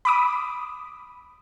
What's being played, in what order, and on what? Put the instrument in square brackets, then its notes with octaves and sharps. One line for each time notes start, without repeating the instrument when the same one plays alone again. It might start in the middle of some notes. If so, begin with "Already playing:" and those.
[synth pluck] B5 D6 D#6